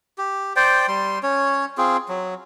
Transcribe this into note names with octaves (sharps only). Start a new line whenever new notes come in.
G4
C5 D5 G5
G3 C6
C#4 C#5
C4 F4 G#4
F#3